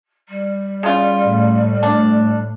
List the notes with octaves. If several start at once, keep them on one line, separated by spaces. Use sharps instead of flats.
G3
C#3 F4
A2
D4